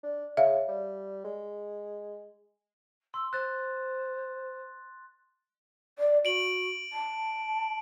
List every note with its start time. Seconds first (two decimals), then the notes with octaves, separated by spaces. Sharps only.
0.03 D4
0.37 C#3 E5 F5
0.68 G3
1.24 G#3
3.14 C6 E6
3.33 C5 F#6 A6
5.99 D5
6.25 F#4 D7 F#7
6.93 A5